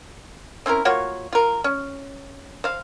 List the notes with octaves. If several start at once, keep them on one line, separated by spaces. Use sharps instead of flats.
C4 C#4 E4 A#4
A#3 F4 F#4 C#5
F4 A#4
C#4
C5 F5